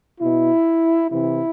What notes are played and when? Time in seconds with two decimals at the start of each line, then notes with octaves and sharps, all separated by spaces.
0.21 B2 E4
1.11 C3 E3 E4